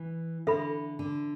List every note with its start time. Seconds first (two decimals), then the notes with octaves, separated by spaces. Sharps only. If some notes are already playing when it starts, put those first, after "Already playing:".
Already playing: E3
0.47 D3 A4 E5 B5
0.99 D3